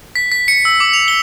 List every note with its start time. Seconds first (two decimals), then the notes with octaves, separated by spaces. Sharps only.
0.15 B6
0.32 B6
0.48 C#7
0.65 E6
0.80 D6
0.93 F7
1.08 G7